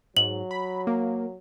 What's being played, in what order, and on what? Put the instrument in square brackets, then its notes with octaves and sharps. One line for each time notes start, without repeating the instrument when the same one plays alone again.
[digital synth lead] G#2 [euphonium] F#3 [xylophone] F#7
[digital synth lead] B5
A#3